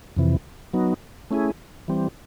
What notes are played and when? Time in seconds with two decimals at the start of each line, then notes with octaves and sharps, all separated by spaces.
0.16 F2 C3 E3
0.73 F#3 B3 D#4
1.31 A3 C#4 E4 G#4
1.88 E3 G3 C4